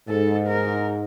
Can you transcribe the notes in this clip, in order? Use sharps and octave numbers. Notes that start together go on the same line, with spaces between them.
G#2 A4
A#4